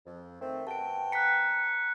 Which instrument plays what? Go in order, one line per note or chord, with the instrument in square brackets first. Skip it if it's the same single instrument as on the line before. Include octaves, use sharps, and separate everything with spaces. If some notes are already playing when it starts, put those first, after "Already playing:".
[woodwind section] F2
D#3 A3 C4
[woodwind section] B2 F#4 G5 [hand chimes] A5 D7
[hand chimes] A#5 B6 [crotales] F#6 C#7